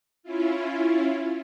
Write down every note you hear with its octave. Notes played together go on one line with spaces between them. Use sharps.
C#4 E4 F4